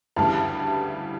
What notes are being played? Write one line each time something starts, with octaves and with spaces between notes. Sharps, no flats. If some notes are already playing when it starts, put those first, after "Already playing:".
D2 C#3 E3 G3 A5